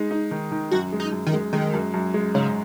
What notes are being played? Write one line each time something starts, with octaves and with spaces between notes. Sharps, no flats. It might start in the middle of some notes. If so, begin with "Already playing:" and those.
Already playing: G#3 D#4
D#4
D#3
D#3
F#2 F#4
G#3
D#4
F#2
D#3
G#3
D#3 G#3
F#2
F#2
G#3
G#2 C#3